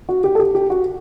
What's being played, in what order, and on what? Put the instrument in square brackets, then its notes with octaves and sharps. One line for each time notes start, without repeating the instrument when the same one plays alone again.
[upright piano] F#4
G4
A4
G4
G4
F#4